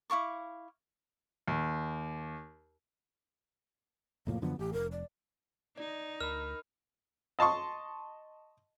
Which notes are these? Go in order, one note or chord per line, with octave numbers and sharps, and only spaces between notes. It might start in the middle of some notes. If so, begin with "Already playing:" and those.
E4 F5 C#6 D6
D#2
F1 A2 F3 A#3
F#2 D3 F3 B3
A1 G4
F1 A#4
D5
D#4 D5
D2 A#4 B5 F6
D#5 A5 C6 C#6